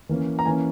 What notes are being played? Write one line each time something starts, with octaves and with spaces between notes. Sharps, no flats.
E3 A#3 C#4
A#5
E3 A#3 C#4 G#5